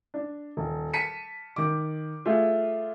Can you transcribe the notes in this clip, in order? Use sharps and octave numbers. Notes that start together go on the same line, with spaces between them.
D4
D#1
A5 B6 C#7 D#7
D#3 D6
A3 F4 G#4